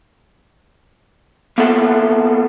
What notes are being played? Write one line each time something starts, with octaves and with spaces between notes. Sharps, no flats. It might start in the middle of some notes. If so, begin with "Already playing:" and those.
A#3 B3 F4 A4 E5 F#5